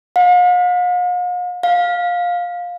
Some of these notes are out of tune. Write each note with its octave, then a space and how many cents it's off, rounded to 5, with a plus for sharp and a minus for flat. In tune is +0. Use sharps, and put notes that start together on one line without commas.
F5 +45
F5 +15